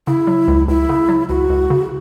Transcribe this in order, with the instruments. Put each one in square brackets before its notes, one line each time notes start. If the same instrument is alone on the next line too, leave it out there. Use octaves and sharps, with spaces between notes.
[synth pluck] C#3 [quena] E4
[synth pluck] F#3
C#2
[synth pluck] C#2 [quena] E4
[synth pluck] C#3
F#3
[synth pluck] C#2 [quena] F#4
[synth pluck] C#2
C#3